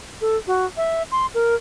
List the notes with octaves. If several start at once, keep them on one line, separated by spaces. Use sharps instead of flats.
A4
F#4
E5
C6
A#4